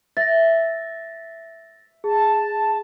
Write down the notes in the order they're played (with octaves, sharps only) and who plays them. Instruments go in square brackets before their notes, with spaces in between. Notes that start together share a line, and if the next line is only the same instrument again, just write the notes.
[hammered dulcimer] E5 [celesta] A6 A#6
[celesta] G#4 [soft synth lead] A5